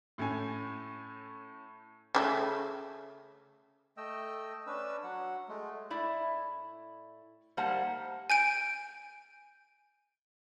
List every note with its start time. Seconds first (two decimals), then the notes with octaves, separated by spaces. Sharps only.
0.18 A2 A3 C#4 G#5
2.15 C#3 G3 A3
3.97 A3 D#5 G5 E6
4.67 C#4 D4 B4 E6
5.03 F#3 F#5
5.48 G#3 A3
5.90 A2 E4 D5
7.57 G#2 G3 A#3 C5 F#5 A5
8.30 G#5 G6 D7